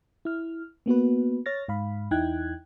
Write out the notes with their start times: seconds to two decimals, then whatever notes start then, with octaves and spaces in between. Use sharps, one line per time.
0.25 E4 F6
0.86 A#3 B3 F#4 B4
1.46 C#5 F6 A6 A#6
1.68 G#2 F5 B5
2.11 E2 D#4 E4 G5 F#6 G#6